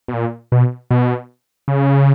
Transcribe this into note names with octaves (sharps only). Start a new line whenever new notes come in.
B2
A#2
B2
B2
C#3